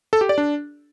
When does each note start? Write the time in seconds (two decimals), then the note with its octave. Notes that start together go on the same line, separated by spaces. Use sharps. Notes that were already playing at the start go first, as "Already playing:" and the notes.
0.13 A4
0.21 G4
0.29 D5
0.38 D4